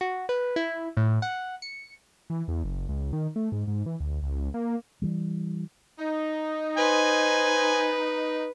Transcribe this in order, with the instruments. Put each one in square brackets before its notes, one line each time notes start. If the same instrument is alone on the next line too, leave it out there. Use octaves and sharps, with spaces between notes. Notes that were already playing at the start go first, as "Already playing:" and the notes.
[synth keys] F#4
B4
E4
A2
F#5
C#7
[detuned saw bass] E3
E2
F#1
C#2
D#3
A3
G#2
G#2
E3
D2
C#2
A#3
[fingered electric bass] E3 G3
[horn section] D#4
[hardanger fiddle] B4 [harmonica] C5 G#5